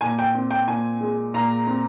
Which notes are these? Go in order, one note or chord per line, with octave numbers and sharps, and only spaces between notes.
A#2 G#5
G5
C4
G5
A#2 G#5
G#3
A#2 A#5
C4